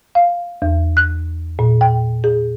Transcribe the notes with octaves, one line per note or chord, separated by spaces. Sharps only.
F5
E2
F#6
A#2
G5
G#4